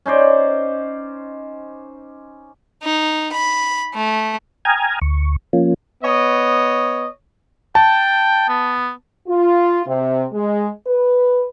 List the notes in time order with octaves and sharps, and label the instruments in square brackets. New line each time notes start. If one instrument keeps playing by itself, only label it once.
[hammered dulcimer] C#4 D#4 C5 D5
[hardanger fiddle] D#4
B5
A3
[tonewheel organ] G5 G#5 A#5 D#6 F6 G#6
D2 C#6
F3 A#3 C#4 F4
[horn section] B3 C#5 D#5
[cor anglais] G5 [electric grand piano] A5
[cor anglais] B3
[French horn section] F4
C3
G#3
B4